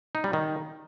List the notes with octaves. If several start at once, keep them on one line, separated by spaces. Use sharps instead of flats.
D#4
G3
D#3